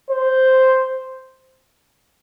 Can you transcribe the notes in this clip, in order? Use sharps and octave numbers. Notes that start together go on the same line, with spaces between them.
C5